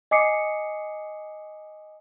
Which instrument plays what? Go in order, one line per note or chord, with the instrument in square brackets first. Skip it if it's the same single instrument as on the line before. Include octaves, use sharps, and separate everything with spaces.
[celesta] D#5 G#5 D6 D#6 C7 C#7